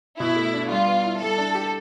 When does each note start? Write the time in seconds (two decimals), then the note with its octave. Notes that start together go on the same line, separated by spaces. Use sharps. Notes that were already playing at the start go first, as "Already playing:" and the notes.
0.19 B2 E4
0.36 A3
0.53 D4
0.70 G3 F4
0.87 B3
1.04 E4
1.21 G3 A4
1.38 D4
1.55 G4